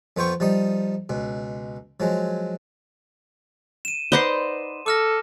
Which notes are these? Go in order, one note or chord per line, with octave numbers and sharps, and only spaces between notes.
F2 B3 F4 C5 G5 C#6
F3 G3 D#4 D#6
C#2 B2
F3 F#3 G#3
D#7 E7
D#4 B4 C5 D5 F#5 C6
A4 D6 F6 A#6